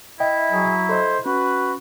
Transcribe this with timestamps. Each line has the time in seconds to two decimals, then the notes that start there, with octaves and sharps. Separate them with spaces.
0.20 E4 D#5 E5 G5
0.52 F#3 G#4
0.89 A4 C5 D#5
1.26 C#4 F#4 B4